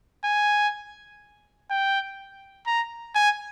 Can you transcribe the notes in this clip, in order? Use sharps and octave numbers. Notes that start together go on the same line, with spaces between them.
G#5
G5
A#5
G#5